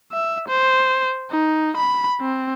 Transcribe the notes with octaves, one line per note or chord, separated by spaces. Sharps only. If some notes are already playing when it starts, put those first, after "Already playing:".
E5
C5
D#4
B5
C4